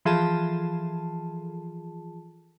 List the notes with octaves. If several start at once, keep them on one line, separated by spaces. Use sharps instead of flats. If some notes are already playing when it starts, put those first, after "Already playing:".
E3 F3 F4 G#4 A4 A5